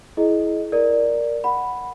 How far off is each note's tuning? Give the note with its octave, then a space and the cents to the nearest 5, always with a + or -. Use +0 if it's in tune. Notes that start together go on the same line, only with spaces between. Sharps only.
E4 +0 G#4 +30 D#5 +0
A#4 +0 D5 +0
F#5 +0 B5 +0